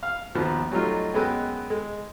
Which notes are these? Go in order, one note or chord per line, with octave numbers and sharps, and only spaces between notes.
F5 F6
A#1 D#2 F3 B3
F#3 G3 A3 D#4 F4
F#2 G#3 B3 D#5 G5
G#3